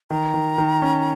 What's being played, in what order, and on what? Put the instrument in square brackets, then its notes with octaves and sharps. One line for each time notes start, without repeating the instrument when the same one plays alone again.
[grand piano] D#3 [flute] A#5
[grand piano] D#3
D#3
C#4